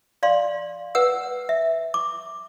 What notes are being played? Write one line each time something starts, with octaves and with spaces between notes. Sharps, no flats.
D5 F5 C6
B4 F#5 E6
E5
D6